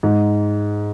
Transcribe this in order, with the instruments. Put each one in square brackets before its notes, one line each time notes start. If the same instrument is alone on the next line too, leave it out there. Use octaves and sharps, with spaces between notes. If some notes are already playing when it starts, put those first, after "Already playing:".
[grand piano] G#2